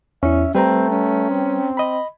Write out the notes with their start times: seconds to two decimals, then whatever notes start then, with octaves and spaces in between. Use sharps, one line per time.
0.23 E2 C#4 E4 E5
0.55 G3 A3 C4 B4 G5 A#5
0.90 C#4
1.30 C4
1.77 D#5 B5